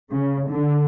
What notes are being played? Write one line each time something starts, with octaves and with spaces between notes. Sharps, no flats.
C#3
D3